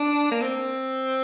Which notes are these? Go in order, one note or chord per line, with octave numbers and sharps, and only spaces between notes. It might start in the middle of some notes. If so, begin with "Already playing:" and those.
Already playing: D4
A#3
C4